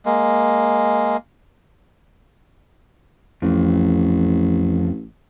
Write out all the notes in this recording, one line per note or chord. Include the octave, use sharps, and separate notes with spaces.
G#3 A#3
A1 F2